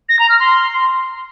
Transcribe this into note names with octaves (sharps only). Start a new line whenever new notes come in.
A#6
A#5
F6
C6